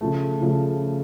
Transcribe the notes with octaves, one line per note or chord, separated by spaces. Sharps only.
C#3 F3 A3
C#3 F3 A3